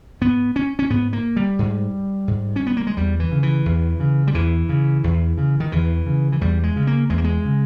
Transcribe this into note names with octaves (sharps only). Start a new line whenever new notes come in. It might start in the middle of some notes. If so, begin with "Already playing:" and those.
G#2 B3
C#4
C#4
G#2 B3
A#3
G3
G#2
G#2
C#4
B3
A#3
G#3
E2 G3
E3
C#3
E3
E2
C#3
G3
E2 E3
C#3
E2
C#3
D#3
E2 E3
C#3
E3
E2 G3
G#3
C#3
A#3
E2 G#3
A#3
G#3
C#3